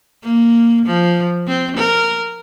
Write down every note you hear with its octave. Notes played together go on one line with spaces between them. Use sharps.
A#3
F3
C4
A#4